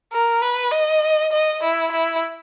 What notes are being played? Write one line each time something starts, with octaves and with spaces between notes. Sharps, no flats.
A#4
B4
D#5
D#5
E4
E4